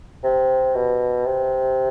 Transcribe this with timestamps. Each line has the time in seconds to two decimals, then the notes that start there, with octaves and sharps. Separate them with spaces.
0.24 C3
0.75 B2
1.26 C3